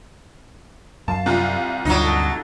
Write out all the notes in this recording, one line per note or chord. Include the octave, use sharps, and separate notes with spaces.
F#2 F5 A5
C2 F4
D2 G2 F#3 D#4
A4